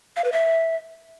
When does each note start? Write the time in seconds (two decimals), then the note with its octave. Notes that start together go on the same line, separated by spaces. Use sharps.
0.16 F5
0.24 B4
0.32 E5